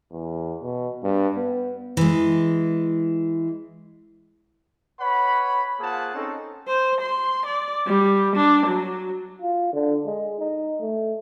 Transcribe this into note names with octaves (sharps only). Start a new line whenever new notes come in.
E2
B2
G2
B3
E3 G#3
B4 C#5 F#5 B5
A#3 F4 G#4 C5 F#5 A5
C4 C#4 D#4 A4
C5
C6
D5
G3
D4
F#3
F4
D3
G#3
D#4
A3